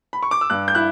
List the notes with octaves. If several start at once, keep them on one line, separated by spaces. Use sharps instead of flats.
B5
C#6
D6
E6
G2 F#6
G6
E4 F#6